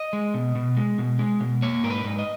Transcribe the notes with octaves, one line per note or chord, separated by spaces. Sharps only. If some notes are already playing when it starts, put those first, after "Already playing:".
Already playing: D#5
G#3
B2
B2
G#3
B2
G#3
B2
A#3 C#5
G#2 A#4
B4
G#2
D#5